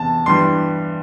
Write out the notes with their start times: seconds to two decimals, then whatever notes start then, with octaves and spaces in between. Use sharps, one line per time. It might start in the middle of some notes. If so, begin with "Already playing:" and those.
Already playing: E2 C3 E3 A5
0.26 G2 E3 G3 C6